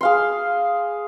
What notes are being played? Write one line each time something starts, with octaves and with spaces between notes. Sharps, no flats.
G#4 F5 C6